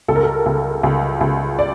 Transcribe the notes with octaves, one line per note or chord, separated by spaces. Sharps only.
C#2 A4
A#4
A4
C#2
C#2
C#2
D5